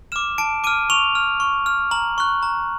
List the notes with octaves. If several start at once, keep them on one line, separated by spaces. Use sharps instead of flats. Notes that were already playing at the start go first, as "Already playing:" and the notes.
D6 F6 E7
A5 D7
D6 F6 D#7
C#6 F7
F6
C#6
F6
A#5 F#7
C#6 F#6
A#5